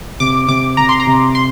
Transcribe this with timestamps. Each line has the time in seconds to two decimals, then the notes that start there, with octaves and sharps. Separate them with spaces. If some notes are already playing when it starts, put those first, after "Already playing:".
0.20 C3 D6
0.48 C3 D6
0.77 C3 A#5
0.89 C6
1.00 A#5
1.07 C3
1.35 C6